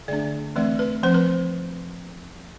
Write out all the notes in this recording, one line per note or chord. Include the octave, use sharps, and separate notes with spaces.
D3 A3 D4 D5
E3 A3 C4 D5
B4
F3 C4 C5
B4